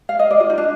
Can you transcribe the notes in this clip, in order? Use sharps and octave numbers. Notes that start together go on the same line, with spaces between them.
F5
D#5
D5
F4
D#4
D4